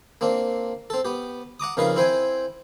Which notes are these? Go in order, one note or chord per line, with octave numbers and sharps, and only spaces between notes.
A#3 C4 D4
C4 A4
B3 G4
F#5 A#5 D6 D#6
F2 C#3 D#4 A#4 B4 F5
C4 E4 C5 G5 G#5